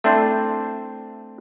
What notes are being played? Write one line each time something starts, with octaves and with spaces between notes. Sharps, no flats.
A3 C4 D4 E4 A4 C5